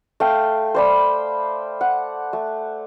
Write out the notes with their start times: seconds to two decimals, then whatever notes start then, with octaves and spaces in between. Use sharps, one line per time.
0.20 A3 F5 G5
0.74 C5 D5 B5
1.81 F#5
2.33 A3